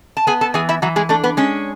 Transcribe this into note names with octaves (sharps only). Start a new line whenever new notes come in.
A5
B3 G#4 G#5
A4 A5
E3 G#4 G#5
E4 E5
E3 F#3 F#4
G#3 G#4
A3 D4 A4
B3 B4
G#3 C#4 C#5